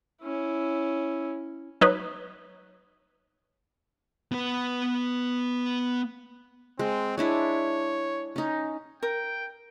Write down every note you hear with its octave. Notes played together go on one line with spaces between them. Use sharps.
C#4 E4
F#3 D#4 B4
B3 B4
G#3 C4
G#3 D4 E4 C#5
C#4 D#4
A#4 G5